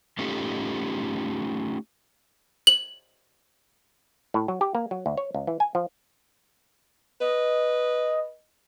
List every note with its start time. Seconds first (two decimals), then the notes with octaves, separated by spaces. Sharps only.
0.19 A3 C#4 D#4 F4 G4 A4
2.67 F#7
4.34 A2
4.48 F#3
4.61 G4
4.75 A#3
4.91 F#3
5.06 D2
5.18 C#5
5.34 C#2
5.47 E3
5.60 G#5
5.75 F3
7.21 B4 D#5